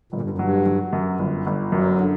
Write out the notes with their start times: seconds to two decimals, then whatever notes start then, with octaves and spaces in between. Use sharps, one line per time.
0.13 G1 A#2
0.21 G2
0.30 F#2
0.38 G2 F#3
0.66 F#3
0.93 F#2
1.19 G1
1.47 G1
1.72 F#2 F#3
2.00 D3